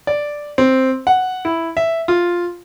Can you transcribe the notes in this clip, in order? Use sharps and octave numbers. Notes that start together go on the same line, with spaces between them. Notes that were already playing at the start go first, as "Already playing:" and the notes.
D5
C4
F#5
E4
E5
F4